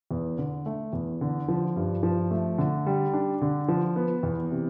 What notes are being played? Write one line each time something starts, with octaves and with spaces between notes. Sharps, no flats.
E2
D3
A3
E2
D3
F3
G2
F3
A3
D3
G3
D4
D3
F3
B3
E2
C3